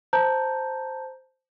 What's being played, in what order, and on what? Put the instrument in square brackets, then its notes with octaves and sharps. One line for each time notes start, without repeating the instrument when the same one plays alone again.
[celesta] C5 A5 A#5 G6